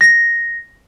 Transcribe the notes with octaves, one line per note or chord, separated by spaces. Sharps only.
A#6